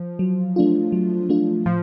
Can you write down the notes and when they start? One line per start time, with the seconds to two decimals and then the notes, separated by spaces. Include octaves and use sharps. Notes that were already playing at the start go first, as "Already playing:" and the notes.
Already playing: F3
0.19 F#3
0.56 A3 D4 F4
0.92 F#3
1.29 A3 D4 F4
1.66 A2 F3